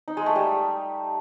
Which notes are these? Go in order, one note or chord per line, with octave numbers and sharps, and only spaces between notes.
D#4
G#3
A3
G3